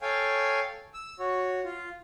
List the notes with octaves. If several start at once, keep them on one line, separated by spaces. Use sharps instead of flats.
A4 C#5 F5 G5 G#5
E6
F#4 C#5
F4